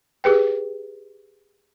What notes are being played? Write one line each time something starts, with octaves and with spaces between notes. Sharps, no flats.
G4 G#4 B4 G5